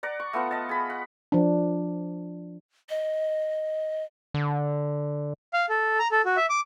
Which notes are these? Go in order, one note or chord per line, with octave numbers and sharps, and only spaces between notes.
D5 F#5 A#5
C#6
A3 B3 F4 F#5
D#5 A5
G#4 B5
F#5
F3 D4
D#5
D3
F5
A4
A#5
A4
F#4
E5
D6